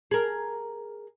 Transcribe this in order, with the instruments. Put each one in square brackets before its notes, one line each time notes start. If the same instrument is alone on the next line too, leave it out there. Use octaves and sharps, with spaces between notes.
[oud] G#4 A#4